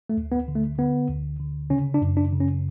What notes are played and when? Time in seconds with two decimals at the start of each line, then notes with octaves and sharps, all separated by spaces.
0.09 A3
0.17 D2
0.32 B3
0.48 D3
0.56 A3
0.78 D3 B3
1.09 D2
1.39 D3
1.70 C#3 C#4
1.94 D4
2.01 F#2
2.17 D4
2.33 C#3
2.40 C#4